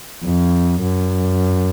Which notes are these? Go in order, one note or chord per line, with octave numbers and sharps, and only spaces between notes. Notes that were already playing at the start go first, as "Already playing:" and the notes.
F2
F#2